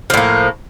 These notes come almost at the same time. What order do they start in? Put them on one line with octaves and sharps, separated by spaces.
F3 A2 A#3